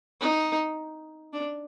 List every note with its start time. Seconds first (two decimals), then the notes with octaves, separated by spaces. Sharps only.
0.21 D#4
1.33 D4